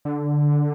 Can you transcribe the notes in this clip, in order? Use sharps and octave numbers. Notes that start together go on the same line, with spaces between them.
D3